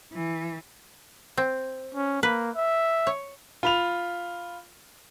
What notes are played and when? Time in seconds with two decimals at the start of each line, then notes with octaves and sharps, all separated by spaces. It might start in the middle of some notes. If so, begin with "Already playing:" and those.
0.13 E3
1.37 C4
1.95 C#4
2.23 A#3 B4
2.56 E5
3.07 C#5
3.63 F4 B5 F7